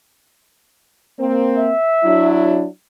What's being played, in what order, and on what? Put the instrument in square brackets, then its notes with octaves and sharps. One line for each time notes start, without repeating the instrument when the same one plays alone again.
[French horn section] A#3 C4
[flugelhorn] E5
[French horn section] F#3 D4 E4